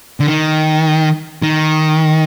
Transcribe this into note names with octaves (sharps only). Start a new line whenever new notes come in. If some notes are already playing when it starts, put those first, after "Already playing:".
D3
D#3
D#3